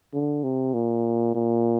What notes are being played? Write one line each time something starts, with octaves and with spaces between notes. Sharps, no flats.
D3
C3
A#2
A#2